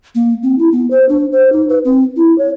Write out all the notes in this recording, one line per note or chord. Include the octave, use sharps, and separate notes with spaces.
A#3
C4
E4
B3
C5
D4
C5
D#4
B4
C4
E4
C#5